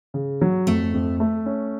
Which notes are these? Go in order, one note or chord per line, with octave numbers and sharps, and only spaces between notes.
C#3
F#3
F2 A3
F2
A3
C#4